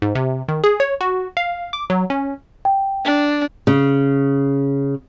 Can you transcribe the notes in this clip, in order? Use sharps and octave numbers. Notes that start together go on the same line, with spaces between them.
G#2
C3
D#3
G#4
C#5
F#4
F5
D6
F#3
C#4
G5
D4
C#3